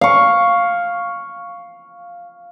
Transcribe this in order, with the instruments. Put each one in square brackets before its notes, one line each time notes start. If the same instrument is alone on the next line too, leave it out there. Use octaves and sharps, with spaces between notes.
[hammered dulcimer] F5 C#6